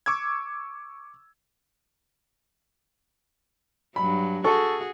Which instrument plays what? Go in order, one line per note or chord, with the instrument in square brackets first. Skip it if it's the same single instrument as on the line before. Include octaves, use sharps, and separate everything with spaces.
[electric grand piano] C#6 D6 E6 G#6
[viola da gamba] G2 F#3 [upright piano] B5
[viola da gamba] F#4 G#4 [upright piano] A4 C#6